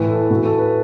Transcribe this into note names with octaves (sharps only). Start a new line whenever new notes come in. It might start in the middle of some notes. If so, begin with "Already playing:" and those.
Already playing: A2 E3 B4
A4
A2 E3 F#4
A4
B4